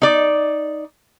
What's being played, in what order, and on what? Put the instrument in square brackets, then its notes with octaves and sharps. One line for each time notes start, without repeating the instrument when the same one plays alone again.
[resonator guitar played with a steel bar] D#4 D5